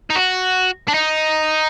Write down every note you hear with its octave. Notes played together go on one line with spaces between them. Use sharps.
D#4
F#4
D4
D#4